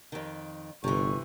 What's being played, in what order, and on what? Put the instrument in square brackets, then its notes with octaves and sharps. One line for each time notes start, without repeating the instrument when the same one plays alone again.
[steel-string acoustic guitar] F2 D#3
[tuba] G1 [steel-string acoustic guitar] C3 E3 [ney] C#6